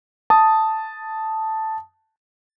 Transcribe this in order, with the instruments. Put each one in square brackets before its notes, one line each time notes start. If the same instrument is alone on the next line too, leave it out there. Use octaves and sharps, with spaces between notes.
[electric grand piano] A5 D#6